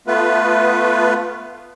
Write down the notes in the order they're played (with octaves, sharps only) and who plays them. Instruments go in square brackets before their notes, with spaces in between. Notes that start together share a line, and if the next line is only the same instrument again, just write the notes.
[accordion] A3 B3 F4 B4